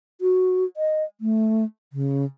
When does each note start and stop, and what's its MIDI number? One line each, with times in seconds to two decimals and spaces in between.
0.21 0.65 66
0.77 1.04 75
1.21 1.64 57
1.93 2.25 49